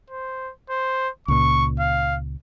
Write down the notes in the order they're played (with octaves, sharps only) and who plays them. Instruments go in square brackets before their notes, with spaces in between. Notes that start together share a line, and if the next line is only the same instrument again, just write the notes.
[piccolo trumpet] C5
C5
[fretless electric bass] C#2 A#2 [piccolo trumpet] C#6
[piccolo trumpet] F5